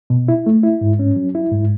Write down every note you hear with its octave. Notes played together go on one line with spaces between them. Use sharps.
B2
E4
A3
E4
G#2
C#4
F#3
E4
G#2